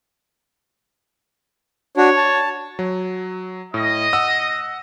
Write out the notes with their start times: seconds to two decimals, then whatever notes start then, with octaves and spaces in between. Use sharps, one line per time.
1.97 D4 F#4 C#5
2.17 A5
2.79 F#3
3.74 A2 D#5
4.13 F#5 D#6 E6